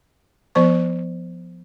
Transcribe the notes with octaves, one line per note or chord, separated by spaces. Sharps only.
F3 B3 C5 C#6